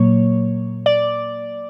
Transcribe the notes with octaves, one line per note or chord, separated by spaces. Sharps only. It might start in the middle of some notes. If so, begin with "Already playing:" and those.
Already playing: A#2 F#3 A#3 C#5
D5